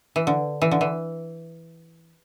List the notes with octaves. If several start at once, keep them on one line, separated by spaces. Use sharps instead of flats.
E3
D3
E3
D3
E3